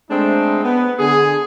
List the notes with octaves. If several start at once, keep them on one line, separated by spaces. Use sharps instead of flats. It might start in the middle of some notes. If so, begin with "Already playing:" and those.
G#3 A3 C4 D4 D#4
B3
D3 G#4